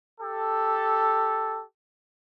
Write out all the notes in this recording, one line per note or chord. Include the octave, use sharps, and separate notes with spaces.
G4 A4